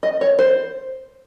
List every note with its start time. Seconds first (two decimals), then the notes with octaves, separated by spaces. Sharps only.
0.03 D#5
0.21 C#5
0.39 C5